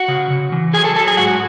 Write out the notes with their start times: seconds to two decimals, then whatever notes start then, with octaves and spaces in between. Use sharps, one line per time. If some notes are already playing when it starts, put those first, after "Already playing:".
Already playing: F#4 F#5
0.08 C#3
0.30 C#3
0.52 E3
0.73 F#3 G#4 G#5
0.84 A4 A5
0.96 F#3 A4 A5
1.07 G#4 G#5
1.17 G#2 F#4 F#5